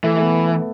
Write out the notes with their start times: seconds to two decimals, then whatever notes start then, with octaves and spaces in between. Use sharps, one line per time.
0.03 E3 A3
0.17 A3
0.21 B3